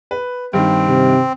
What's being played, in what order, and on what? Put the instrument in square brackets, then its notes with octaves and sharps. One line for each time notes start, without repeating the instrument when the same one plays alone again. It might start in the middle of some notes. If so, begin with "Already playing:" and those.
[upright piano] B4
[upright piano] G2 D#3 [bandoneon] C4
[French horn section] C3